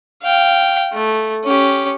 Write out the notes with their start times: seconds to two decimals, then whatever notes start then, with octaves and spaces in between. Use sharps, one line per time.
0.23 F5 G5
0.93 A3
1.44 C#4 G4